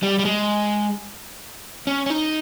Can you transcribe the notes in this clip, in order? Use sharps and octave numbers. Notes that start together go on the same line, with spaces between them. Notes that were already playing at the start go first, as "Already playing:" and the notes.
G3
G3
G#3
C#4
C#4
D#4